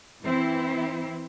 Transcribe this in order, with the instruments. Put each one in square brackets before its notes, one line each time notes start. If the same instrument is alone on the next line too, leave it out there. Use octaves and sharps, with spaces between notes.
[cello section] E3 C4 E4